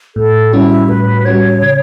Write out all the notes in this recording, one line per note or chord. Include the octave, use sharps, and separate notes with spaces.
A2 A4
G3 C#4 E4 F#4
A2 B4
G3 C#4 F#4 C#5
C#3